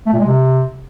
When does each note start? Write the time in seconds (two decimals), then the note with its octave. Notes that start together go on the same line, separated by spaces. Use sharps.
0.06 A3
0.13 A#2
0.20 G#3
0.26 C3